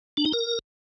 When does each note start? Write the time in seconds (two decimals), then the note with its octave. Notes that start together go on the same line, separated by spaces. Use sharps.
0.17 D4
0.25 D#4
0.33 A#4